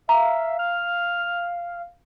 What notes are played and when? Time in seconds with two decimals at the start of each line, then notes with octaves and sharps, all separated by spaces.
0.09 E5 F5 A#5
0.59 F6